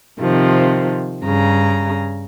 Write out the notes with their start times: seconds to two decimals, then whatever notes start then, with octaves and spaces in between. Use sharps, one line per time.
0.20 C3 D#3 F3
1.22 G2 C#3 A#5